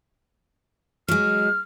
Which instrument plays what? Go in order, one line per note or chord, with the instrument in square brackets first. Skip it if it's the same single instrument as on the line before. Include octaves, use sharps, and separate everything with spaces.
[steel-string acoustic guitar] F#3 G#3 [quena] F6